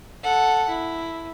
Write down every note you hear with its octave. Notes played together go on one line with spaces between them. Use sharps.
A4 F#5
E4